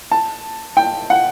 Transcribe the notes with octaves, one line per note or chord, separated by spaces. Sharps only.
A5
G5
F#5